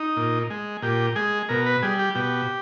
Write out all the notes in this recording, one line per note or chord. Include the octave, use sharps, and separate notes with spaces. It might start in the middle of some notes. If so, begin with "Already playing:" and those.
Already playing: D#4
A#2
G#3
A#2 G4
G#3 G#4
B2 A#4
B4
G3 G#4
G4
B2 G4